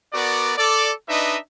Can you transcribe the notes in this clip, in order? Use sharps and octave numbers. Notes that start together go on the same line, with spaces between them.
B3 F#4 A#4 D5
A4 D5
D4 D#4 B4 D#5 E5